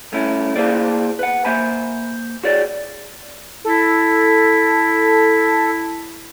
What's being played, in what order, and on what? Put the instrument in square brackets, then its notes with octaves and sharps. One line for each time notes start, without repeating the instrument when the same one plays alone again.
[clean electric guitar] G2 A3 C#4 E4
A#3 E4 G#4 C5 D5
B4 F#5
A#3 C5 E5 G#5 B5
F#4 G#4 C#5 D5
[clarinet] E4 [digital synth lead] A4